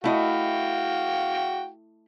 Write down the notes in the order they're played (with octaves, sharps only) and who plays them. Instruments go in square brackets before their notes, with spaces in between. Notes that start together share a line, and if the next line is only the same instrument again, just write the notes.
[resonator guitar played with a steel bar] A3 E4 D#5 [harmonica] F#4 F5 G5